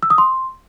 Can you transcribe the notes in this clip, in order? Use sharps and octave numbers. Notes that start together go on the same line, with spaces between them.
E6
D#6
C6